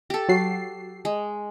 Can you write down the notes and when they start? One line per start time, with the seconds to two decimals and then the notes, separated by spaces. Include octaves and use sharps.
0.10 G4 A4
0.29 F#3 F#4 C7
1.05 G#3